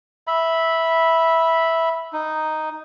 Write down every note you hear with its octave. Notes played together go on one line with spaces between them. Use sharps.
E5 B5
D#4